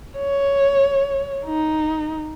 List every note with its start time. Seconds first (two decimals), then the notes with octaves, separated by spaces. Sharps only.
0.17 C#5
1.46 D#4